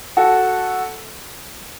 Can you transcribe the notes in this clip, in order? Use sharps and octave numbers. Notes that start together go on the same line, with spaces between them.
F#4 A4